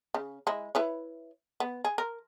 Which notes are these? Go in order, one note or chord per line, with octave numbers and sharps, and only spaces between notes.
C#3
G#3 E4
E4 B4 C#5
B3
G#4
A#4